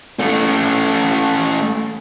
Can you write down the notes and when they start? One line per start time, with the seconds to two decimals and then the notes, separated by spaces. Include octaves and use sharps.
0.19 A3 C#4